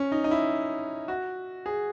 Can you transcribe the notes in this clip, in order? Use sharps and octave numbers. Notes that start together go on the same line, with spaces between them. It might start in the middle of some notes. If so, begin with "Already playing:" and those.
Already playing: C#4
D#4
D#4
E4
F#4
G#4